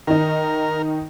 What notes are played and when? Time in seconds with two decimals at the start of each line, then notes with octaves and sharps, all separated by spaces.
0.07 D#3 D#4 A#4